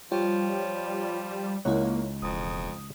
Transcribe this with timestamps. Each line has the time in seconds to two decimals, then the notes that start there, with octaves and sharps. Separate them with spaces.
0.12 F3 G3 F4 C#5 G5
1.65 C#2 A#3 D#4 E4 C#5 F#5
2.22 E1 F2 D#6